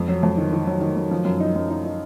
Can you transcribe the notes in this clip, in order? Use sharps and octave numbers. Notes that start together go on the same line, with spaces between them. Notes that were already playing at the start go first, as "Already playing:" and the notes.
Already playing: F2
F#3
F2
D#3
D#3
F#3
D#3
F#3
F3
F#2
D#4
F#2
D#4
D#4